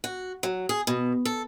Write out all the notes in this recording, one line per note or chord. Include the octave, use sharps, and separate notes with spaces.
F#4
F#3
G#4
B2
A4